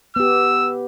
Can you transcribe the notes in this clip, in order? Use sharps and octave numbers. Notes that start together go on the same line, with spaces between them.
B3 G4 E6